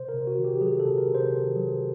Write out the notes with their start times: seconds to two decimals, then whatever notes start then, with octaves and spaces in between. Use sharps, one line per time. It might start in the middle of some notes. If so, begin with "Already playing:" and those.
Already playing: C3 C5
0.09 A#4
0.14 C3
0.27 F#4
0.39 D#3
0.44 G4
0.61 F#3 G#4
0.80 A4
0.86 C3
0.98 A#4
1.08 C3
1.15 C5
1.32 D#3
1.56 F#3